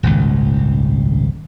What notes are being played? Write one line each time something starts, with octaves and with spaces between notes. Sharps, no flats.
D#1 G#1 C#2